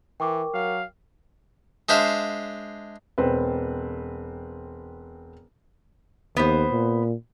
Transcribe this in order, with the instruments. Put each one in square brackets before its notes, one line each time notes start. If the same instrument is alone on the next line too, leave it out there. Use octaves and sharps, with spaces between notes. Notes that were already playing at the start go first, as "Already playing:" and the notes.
[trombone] E3 [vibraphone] A#4 [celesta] G5 C#6 D6
[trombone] F#3 [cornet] F5
[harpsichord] G#3 D4 C5 E5 F5
[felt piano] E1 C4 B4
[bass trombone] D#2 [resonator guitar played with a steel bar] B3 C5
[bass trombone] A#2